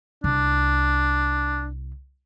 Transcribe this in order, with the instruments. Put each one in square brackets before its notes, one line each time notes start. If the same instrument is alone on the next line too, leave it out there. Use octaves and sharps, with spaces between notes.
[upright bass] C2 [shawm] D4